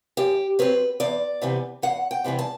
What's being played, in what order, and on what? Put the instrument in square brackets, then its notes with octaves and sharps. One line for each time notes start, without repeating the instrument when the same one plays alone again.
[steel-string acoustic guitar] F#2 G4
F#3 C4 B4
E2 D5
C3 E3 G3 B3
E2 F#5
G5
C3 E3 G3 B3
A5